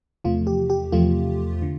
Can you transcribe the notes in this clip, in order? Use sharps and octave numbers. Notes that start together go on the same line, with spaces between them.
E2 C3 F3 A3 F4
G4
G4
E2 C3 F3 A3 F4
D3